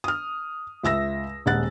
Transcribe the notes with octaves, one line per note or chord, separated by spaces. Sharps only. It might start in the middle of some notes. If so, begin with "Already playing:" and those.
D#6 F6
C#2 E5 E6 A#6
D#1 G#3 F#5 F#6 A6